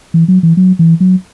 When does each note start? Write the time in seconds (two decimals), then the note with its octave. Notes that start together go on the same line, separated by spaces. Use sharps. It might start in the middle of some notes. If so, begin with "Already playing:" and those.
0.14 E3
0.28 F#3
0.43 E3
0.57 F#3
0.79 E3
1.00 F#3